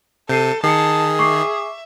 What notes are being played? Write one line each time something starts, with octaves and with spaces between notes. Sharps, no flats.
C3 A4 G6 C7 D#7
D#3 G#4 A5 C7 C#7
E5 C#6 D6 C7